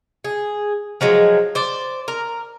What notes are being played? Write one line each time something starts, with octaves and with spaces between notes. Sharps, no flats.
G#4
F3 F#3 G#3
C5 D5
A#4